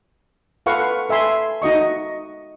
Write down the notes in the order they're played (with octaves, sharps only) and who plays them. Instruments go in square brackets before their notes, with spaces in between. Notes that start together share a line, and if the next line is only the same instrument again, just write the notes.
[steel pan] F4 A4 B4 F5 F#5 C#6
A4 E5 G#5 C6
D#4 F#4 D#5 C#6